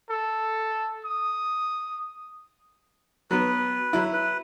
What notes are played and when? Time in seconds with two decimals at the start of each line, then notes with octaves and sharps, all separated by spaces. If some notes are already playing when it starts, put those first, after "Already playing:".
0.10 A4
1.05 D#6
3.31 F#3 B3 B4
3.93 F#3 E4
4.13 B4